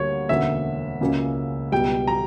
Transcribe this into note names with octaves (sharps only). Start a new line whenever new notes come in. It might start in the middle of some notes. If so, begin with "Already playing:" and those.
Already playing: D2 D3 G3 A#3 C#5
E1 D2 D3 A#3 C#4 E5
C#2 C#3 F#3 A#3 C#4
C#2 B2 G3 G5
A#5